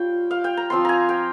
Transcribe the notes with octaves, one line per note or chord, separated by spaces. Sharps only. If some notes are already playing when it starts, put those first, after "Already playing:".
Already playing: G3 F4 C#5 G5
F5
G5
A#5
F3 C4 F4 C6
G#5 A#5
G5